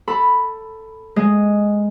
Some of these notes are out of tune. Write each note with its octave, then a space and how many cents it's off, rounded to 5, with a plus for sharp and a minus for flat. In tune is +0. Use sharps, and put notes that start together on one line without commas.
A4 +10 B5 +0
G#3 +0 D#5 +0